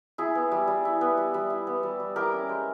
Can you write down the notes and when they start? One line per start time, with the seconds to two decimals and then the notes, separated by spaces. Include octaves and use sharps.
0.18 E4 G#4
0.35 B3
0.51 G3
0.67 G3
0.85 E4
1.01 B3
1.17 G3
1.34 G3
1.50 E4
1.67 B3
1.83 G3
2.00 G3
2.16 E4 G4 A#4
2.33 C#4
2.49 G#3